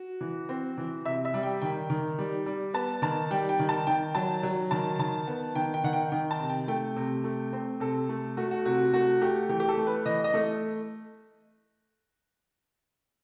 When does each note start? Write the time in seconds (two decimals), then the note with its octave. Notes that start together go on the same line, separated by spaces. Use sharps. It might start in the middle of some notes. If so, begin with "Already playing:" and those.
Already playing: F#4
0.21 E3
0.49 C4
0.78 E3
1.05 C3 E5
1.25 E5
1.34 G3
1.43 G5
1.62 D#3 G5
1.90 D#3
2.19 G3
2.46 G3
2.74 B3 A5
3.02 D#3 A5
3.31 G3 G5
3.49 G5
3.59 D#3
3.69 A5
3.87 D#3 G5
4.15 F#3 A5
4.43 F#3
4.71 D#3 A5
4.99 D#3 A5
5.27 B3
5.55 D#3 G5
5.74 G5
5.84 D#3 F#5
5.93 G5
6.12 D#3 G5
6.31 A5
6.40 C3
6.49 G5
6.68 A3 G5
6.96 C3
7.24 A3
7.53 C4
7.80 C3 A4
8.09 A3
8.37 A3 F#4
8.51 F#4
8.65 C3 F#4
8.94 A3 F#4
9.21 A3 G4
9.49 E3 G4
9.60 G4
9.69 A4
9.77 A3
9.87 B4
10.06 E3 D#5
10.24 D#5
10.34 A3